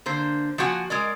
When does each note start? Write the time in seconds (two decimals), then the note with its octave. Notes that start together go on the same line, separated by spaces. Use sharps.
0.06 D3 A#3 C5
0.58 F3 A#3 F#4 F#5 G#5
0.90 G#3 A#4 D5